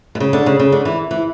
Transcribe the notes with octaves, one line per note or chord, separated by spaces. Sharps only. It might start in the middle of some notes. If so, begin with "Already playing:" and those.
B2
C#3
D3
C#3
C#3
D3
E3
E3